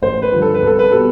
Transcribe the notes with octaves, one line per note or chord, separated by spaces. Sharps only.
A1 C5
B4
G2 D3 F3
A4
B4
C2 A4
B4
B2 G3 A4